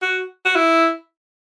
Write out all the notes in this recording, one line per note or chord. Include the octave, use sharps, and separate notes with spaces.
F#4
F#4
E4